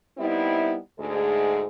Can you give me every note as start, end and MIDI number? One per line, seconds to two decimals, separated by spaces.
0.18 0.76 55
0.18 0.76 59
0.18 0.76 60
0.18 0.76 63
0.18 0.76 64
0.99 1.65 38
0.99 1.65 44
0.99 1.65 68